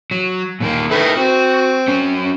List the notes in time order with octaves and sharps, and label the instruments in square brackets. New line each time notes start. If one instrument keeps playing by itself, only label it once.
[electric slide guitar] F#3
A#2 D#3 A#3
[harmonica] D#3 A3 E4 [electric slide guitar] A#4 B4
[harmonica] C4 [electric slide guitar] F#4
[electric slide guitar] F#3 C#4